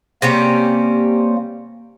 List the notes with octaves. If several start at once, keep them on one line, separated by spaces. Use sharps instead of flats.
C3 G3 A#3 C#4